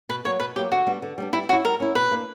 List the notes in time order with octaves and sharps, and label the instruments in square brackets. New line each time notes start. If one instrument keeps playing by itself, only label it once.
[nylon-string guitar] B2 [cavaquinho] B4
[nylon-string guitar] F#3 A#3 [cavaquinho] C#5
[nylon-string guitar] B2 [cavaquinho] B4
[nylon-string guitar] F#3 [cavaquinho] G4
[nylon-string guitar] A#3
[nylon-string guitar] D3 [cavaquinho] F#4
[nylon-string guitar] G3 B3 D4
D3
G3 B3 D4
[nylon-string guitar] G3 [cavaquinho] E4
[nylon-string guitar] C#4 [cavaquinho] F#4
[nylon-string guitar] E4
[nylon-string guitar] G3 [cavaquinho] A#4
[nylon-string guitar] C#4 E4
[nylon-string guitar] B2 [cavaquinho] B4
[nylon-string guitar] A#3 D4